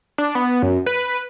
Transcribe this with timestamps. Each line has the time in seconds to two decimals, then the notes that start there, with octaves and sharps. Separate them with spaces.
0.18 D4
0.35 B3
0.62 F#2
0.86 B4